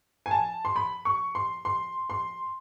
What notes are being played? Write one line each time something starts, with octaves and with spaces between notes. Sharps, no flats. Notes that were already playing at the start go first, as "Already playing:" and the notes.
G#5
A5
C6
B5
C#6
C6
C6
C6